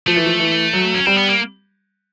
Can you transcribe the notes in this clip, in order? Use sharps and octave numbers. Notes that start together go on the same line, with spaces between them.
F3 A3
E3
F3
E3
F#3
C#4
G3 C4
B3
A#3